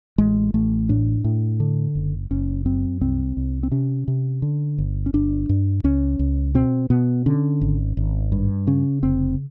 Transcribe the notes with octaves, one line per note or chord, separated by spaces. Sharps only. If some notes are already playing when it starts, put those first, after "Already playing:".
A1 G#3
A1 A3
A2 D4
A2
D3
F#1
F#1 C#4
F#2 C4
C2 C4
C2
C4
C3 C#4
C3
D3
G1
C#4
G1 D4
G2
C#2 C#4
C#2
B2 C4
B2 B3
D3 C#4
G#1
G#1
G2
C#3 C#4
F1 C4